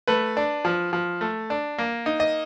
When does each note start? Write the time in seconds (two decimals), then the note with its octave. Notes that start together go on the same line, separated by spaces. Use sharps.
0.07 A3 B4
0.37 D4
0.65 F3
0.93 F3
1.21 A3
1.50 D4
1.78 A#3
2.06 D#4
2.20 D#5